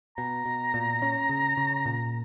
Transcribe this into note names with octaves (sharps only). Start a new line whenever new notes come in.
B2 A#5
B2
A#2
C#4
C#3
C#3
A#2